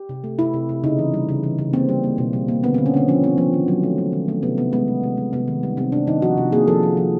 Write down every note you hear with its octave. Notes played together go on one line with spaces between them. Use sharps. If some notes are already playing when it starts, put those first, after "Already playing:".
Already playing: G4
C3
A3
C3 E4
C3
C3
C#3 D#4
E3
G3
C#3
E3
C#3
A#3 C4
G3
A#3
B2
G3
A#3
D3 B3
D3 C4
C#4
D3 C4
F3 C#4
D3 C4
F3 B3
D#3
F#3
A3
A3
D#3
A3
C3 B3
C3 B3
G#3 B3
C3
C3
G#3
C3 B3
D#3
G3
C3 C4
C3 D4
D#3 D#4
F3 F#4
C3
A#3 G#4
F3 A4
F3
F3